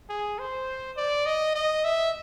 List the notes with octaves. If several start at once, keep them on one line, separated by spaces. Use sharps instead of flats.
G#4
C5
D5
D#5
D#5
E5